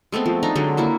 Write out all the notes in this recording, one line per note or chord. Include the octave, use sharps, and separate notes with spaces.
G#3 A3 B3 C4
F3
D4 D#4 A#5
D3 F#3 G#3
A#3 E4 F#4